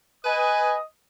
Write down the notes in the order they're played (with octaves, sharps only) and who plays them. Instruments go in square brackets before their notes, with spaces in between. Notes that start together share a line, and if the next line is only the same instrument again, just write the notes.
[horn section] B4 G#5 [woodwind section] D#5 D#6